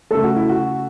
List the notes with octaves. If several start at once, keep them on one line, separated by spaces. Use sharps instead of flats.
C#3 A3 A4
F#4
E4
F#4